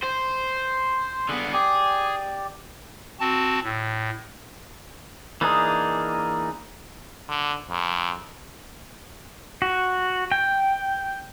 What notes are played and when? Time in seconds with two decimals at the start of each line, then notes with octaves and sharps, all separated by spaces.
0.04 C5
1.29 D3 B3 G#4
1.53 G4 G#4 D5
3.20 C4 F#4 A5
3.63 A2
5.41 E3 A#3 D4 D#4 G#4
7.29 D3
7.70 F2
9.62 F#4
10.32 G5